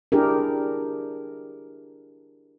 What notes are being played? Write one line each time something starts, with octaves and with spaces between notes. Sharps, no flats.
D4 E4 G4 G#4 A#4